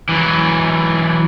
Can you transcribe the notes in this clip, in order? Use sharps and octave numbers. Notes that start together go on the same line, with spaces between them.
E3 F#3